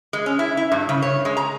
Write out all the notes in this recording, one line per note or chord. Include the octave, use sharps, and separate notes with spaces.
G#3
C#4
E4
E4
G2
C#3
C#5
G#3
A#5